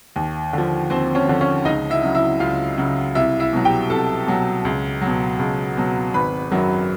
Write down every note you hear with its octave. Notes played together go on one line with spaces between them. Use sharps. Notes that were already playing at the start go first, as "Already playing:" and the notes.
D#2
D3 F3
D#2 C4 C5
C#4 C#5
D3 F3
C#4 C#5
C#2 D#4 D#5
E4 E5
C#3 F#3
E4 E5
C#2 F4 F5
C#3 F#3
C2 E4 E5
E4 E5
B2 F#3
G4 G5
C2 A4 A5
B2 F#3
C#2
F#3
B2
C#2
B2 F#3
G#1 B4 B5
F#2 D#3 F#3